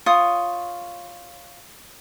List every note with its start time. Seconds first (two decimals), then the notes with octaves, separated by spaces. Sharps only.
0.06 F4 C#5 D#6